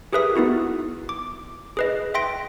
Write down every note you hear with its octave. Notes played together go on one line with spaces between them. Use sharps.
G4 G#4 A#4 B4 E5 D#6
B3 D#4 E4 F#4
D6
G#4 B4 D#5
E5 G5 C6 A#6 D7